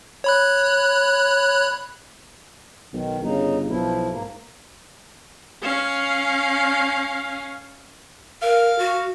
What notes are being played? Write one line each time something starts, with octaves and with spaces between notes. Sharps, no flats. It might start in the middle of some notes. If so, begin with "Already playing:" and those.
C#5 B5 F#6
B1 D#3
G1 C#3 D#4
B1 F3 E4
G#2 A#3
C#4 F5
A#4 F5
F#4